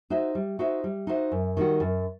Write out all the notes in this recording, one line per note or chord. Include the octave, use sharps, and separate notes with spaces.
D#4 F#4 C5 E5
G3
D#4 F#4 C5 E5
G3
D#4 F#4 C5 E5
F#2
D#3 G3 D#4 F#4
F#2